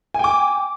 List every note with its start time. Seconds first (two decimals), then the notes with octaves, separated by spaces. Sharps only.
0.14 G#5
0.19 G5
0.24 D6